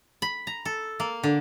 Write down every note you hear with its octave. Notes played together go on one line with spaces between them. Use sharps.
B5
A#5
A4
A#3
D3